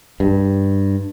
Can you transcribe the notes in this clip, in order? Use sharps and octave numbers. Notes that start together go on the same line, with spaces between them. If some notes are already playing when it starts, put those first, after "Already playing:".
G2